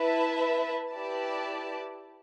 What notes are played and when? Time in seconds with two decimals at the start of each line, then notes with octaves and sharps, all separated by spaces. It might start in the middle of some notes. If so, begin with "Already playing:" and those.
Already playing: E4 B4 E5 A5
0.92 E4 G4 B4 D5 A5